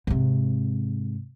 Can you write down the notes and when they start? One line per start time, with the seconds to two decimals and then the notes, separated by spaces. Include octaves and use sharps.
0.07 G#2 C3